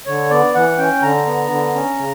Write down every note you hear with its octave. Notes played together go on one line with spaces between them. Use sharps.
D3 C#5
B3 D5
E3 F#5
C#4 G5
D3 A#5
B3
D3
C#4
C#3